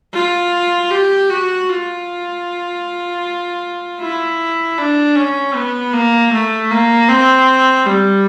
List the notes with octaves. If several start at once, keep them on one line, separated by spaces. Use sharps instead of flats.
F4
G4
F#4
F4
E4
D4
C#4
B3
A#3
A3
A#3
C4
G3